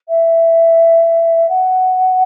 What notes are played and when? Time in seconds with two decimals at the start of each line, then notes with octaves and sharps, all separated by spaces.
0.08 E5
1.49 F#5